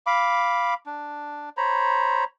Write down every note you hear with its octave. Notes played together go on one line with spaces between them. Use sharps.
F5 B5 D6
D4
C5 C#5 A#5 B5